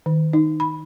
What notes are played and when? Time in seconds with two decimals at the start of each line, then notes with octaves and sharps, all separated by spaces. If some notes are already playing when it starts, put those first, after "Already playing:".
0.06 D#3
0.33 D#4
0.60 B5